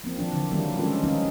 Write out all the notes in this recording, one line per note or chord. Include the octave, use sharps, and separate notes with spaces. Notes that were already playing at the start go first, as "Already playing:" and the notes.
F3 A#3 C4
E3 F3 D4
D3
D#3 F#3 G3 A#3 D4 E4
E3 G#3 C#4 F4 A4
D#3 E3 F#3 C4 C#4 D#4